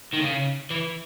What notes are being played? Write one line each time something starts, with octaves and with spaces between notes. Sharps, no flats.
D#3
C#3
E3